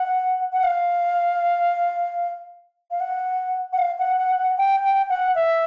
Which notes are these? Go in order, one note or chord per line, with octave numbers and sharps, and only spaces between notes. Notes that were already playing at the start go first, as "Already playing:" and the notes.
Already playing: F#5
F#5
F5
F5
F#5
F#5
F5
F#5
F#5
F#5
G5
G5
F#5
E5